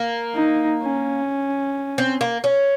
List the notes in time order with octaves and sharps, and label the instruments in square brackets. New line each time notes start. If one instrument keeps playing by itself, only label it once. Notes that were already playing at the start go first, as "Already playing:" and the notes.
Already playing: [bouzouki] A#3
[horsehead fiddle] D#4
C#4
[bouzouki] C4
A#3
C#4